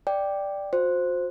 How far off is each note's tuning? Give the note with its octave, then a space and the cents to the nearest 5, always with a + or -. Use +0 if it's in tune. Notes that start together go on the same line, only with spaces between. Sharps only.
D5 +0 G5 +0
F#4 -45 C5 +0